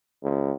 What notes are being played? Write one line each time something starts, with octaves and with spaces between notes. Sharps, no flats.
C#2